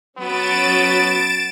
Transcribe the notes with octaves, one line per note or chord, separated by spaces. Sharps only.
F#3 B3 C#4 A6 D7 E7